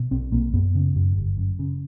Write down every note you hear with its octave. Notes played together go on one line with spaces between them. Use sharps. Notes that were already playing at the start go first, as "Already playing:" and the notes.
Already playing: B2
B1 C4
B1 A#3
F#2 B3
C#3
F#2
G1
F#2
C#3